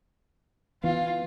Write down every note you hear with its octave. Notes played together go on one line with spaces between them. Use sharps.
E3 B3 F4 F5